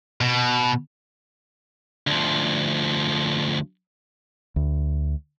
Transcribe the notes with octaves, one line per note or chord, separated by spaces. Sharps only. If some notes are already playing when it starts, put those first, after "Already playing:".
B2
D2 F3
D2